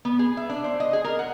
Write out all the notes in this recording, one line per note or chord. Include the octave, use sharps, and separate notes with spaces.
B3
G#4
E5
D4
C5
D#5
G#4
A#4
F#5